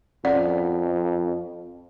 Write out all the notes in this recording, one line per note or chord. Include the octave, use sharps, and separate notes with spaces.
F2 C#4 D5 F#5